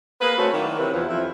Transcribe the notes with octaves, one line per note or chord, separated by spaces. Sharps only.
A#3 G#4 B4
A3 C4 C#4 F#4
D#3 F#3 A#3 E4 D5
C3 E3 F#3 B4
E2 F3
F2 E4